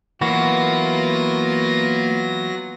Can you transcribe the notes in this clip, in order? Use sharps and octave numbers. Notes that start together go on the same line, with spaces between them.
E3 F#3 A#3 B3 F4 F#4 A#6